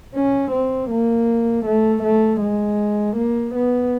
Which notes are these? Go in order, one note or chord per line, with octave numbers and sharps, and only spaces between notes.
C#4
C4
A#3
A3
A3
G#3
A#3
B3